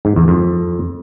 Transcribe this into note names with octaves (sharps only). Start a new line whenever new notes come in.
G#2
E2
F2